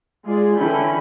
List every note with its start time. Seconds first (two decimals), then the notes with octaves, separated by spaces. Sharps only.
0.24 G#3 F4 G#4 D5
0.56 D3 E3 C#4 E4 G5 B5